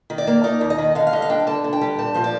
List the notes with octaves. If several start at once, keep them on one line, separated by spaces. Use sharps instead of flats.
D#3
D5
A#3
D#4 D5
D#2
D#5
D#3
D3 F5
F5
G3 D#5
F5
D4 G5
D3 A5
D3
G5
G3
A#2 A5
F3 C5
D5